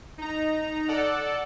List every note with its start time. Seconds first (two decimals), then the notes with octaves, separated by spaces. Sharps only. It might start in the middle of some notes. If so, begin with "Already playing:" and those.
0.18 D#4 A#5
0.88 A4 D5 F#5